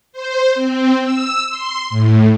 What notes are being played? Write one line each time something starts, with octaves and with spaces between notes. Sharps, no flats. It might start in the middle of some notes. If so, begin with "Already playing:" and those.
C5
C4
E6
C6
A2